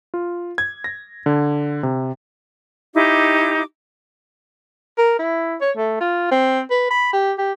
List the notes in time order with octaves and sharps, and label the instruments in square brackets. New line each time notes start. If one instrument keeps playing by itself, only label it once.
[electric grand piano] F4
G#6
A#6
D3
C3
[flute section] D#4 E4 G4 D6
[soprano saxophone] A#4
E4
C#5
A3
F4
C4
B4
B5
G4
G4